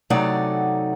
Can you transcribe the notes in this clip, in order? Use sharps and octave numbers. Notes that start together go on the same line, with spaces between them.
C3 F#3 A3 D#4 D5 F#5